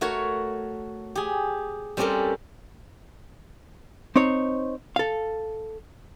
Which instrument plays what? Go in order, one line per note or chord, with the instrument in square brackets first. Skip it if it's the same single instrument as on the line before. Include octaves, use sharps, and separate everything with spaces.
[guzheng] A3 F#4 A#4 C#5
G4 G#4
G3 C4 C#4 G4 A4 A#4
[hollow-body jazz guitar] C4 D#4 C5 C#5
A4 F5